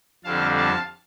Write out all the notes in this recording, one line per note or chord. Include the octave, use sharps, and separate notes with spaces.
F2 D3 G3 C4 F5 A5
F5 A5